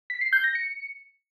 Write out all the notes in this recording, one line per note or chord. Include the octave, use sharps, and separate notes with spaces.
B6
C7
G6
A#6
C#7